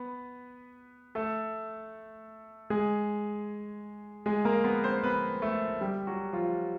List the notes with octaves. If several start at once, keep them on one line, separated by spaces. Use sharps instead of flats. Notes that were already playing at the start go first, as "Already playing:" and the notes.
Already playing: B3 B4
A3 A4
G#3 G#4
G#3 G#4
A#3 A#4
B3 B4
C4 C5
B3 B4
A3 A4
G3 G4
F#3 F#4
F3 F4